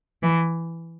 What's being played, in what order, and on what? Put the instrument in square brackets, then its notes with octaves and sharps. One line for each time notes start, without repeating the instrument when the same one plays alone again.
[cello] E3